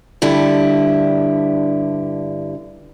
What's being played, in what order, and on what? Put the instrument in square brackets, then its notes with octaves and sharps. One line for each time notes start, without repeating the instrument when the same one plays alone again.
[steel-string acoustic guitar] G2 D3 E4 G4